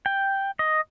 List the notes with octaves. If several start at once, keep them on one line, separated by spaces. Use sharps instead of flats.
G5
D#5